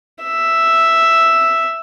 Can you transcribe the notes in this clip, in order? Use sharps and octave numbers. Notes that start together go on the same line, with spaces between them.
E5